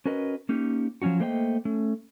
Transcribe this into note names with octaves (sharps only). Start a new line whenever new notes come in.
C#4 F#4 A#4 B4 D#5
A#3 C#4 D#4 G4
F3 F#3 C#4 D#4 F#4
A3 A#3 C5 D#5 F#5 G5
A3 C#4